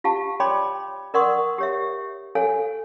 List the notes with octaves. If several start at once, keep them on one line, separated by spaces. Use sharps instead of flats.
F4 G4 F5 A5
C#5 D5 G5 B5 C6 D6
A#4 D5 F#5 C6 C#6 D#6
G4 C#5 E5
A4 C#5 F5 G#5